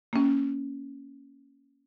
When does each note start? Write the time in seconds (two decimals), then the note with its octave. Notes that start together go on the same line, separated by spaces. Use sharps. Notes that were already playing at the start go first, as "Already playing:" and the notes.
0.13 A#3 C#4